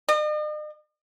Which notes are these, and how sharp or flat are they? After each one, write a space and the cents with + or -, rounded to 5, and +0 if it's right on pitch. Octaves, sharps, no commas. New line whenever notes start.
D#5 -45